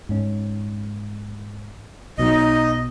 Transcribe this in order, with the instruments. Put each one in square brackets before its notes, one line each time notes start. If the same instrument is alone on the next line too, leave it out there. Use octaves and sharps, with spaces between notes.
[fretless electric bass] G#2 C#4
[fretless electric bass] B1 B2 F#3 [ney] D#4 [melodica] D#5